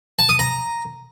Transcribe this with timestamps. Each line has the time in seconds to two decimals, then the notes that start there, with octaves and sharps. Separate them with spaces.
0.19 A5
0.29 D#6
0.39 A#5